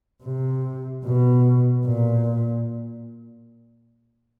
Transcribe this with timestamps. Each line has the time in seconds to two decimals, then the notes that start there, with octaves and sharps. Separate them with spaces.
0.23 C3
1.05 B2
1.86 A#2